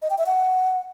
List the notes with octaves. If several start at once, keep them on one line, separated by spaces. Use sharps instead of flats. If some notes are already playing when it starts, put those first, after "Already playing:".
D#5
G5
E5
F#5